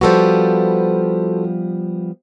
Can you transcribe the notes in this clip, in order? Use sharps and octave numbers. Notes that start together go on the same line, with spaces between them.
F3 G3 B3 F#4 A4 C5